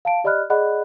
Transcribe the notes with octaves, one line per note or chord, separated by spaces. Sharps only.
F5 A5 D7
G4 D5 D#5 B5 F6 F#6
G#4 D5 D#5 F#5 B5 F#6